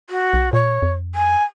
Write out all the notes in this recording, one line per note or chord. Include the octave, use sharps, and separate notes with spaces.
F#4
B1
A#2 C#5
F2
G#5